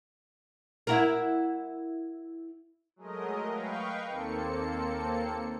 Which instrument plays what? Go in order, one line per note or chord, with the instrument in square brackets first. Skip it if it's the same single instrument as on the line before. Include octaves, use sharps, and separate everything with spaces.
[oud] E4 F#4 A#4
[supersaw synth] F#3 G#3 A3 A#4 D#5
B4 D#5 F5 G5 C#6
D#2 A#3 C4 A4 C#7